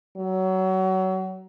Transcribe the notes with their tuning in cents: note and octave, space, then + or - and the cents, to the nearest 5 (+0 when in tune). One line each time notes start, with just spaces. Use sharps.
F#3 +25